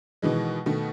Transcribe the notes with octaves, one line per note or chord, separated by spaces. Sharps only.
B2 D#3 E3 G#3
B2 D#3 A3